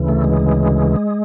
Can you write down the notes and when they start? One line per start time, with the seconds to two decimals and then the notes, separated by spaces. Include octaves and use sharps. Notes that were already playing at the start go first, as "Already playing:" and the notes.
Already playing: D2 C#3 E3
0.08 A3
0.24 G#3